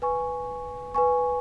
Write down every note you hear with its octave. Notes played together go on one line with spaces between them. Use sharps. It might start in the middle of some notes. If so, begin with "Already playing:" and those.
B4 G#5 C#6
B4 G#5 C#6